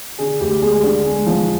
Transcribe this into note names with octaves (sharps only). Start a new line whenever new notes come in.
D3 G#4
D2 G4
G#3 G#4
G4
D3 G#4
G#3
F3